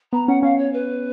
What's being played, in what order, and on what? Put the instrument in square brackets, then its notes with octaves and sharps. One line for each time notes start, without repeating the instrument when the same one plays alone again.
[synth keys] B3 [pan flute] A#5
[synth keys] C#4 [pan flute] F#5
[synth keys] C#4 [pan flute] F5
[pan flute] C#5
B4